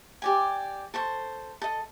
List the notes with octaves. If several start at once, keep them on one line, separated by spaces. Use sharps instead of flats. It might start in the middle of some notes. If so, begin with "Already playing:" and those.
G4 D5 G#5
A4 C5 C#6
A4 D#5